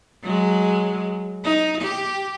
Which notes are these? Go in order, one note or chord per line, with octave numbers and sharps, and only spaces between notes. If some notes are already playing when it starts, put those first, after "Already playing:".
F#3 G#3
D#4
G4